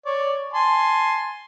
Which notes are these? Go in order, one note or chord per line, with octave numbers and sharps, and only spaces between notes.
C#5 D5
G#5 A5 C6